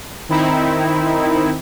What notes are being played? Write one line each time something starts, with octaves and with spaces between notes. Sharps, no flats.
D#3 C4 D#4 E4